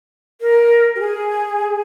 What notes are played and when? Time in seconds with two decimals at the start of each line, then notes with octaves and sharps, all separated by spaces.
0.41 A#4
0.95 G4
1.00 G#4